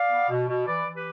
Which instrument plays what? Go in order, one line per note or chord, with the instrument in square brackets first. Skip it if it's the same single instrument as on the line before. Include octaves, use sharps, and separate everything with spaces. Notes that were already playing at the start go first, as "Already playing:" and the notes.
Already playing: [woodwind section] D5 F5
B3
B2
B2
E3 B4 D5
E3
G4 B4